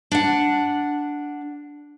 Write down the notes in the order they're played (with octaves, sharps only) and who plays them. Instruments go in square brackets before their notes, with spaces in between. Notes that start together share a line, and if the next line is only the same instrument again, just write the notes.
[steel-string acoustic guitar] D4 F#5